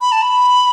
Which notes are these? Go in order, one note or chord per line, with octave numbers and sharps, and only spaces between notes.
B5
A5
B5